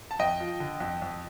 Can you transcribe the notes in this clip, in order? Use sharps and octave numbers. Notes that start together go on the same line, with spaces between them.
A5
F2 D#5 G5
F3
D3
F2
F2